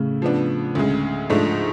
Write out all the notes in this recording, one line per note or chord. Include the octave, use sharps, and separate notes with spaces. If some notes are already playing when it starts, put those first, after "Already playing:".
Already playing: A2 C#3
F3 B3 D4
D2 C#3 G#3
G#2 F3 A3 D4